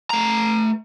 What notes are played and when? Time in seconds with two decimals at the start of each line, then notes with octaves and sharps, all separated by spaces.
0.10 A3 A#5